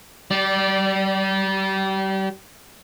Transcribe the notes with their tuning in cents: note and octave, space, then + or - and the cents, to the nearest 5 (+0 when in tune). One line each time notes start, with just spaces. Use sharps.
G3 -30 D5 +0